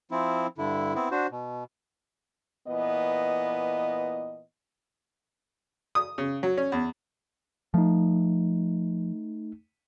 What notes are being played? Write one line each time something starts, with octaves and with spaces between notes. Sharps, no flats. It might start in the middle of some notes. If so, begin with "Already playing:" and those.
F3 C4 E4
G2 D3 E4
B3 C4 E4
D4 F#4 C5
B2
A#2 E3 B3 D#5
D#6
C#3
F#3
C#4
E2
F3 A3 D#4